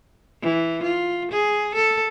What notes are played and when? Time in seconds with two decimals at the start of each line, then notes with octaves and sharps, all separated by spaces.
0.42 E3
0.84 F4
1.32 G#4
1.75 A4